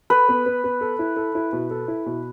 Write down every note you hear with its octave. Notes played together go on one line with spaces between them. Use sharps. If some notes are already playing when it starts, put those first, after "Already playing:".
A4 B4
B3
B3
B3
A4
E4
A4
E4
B2
A4
E4
B2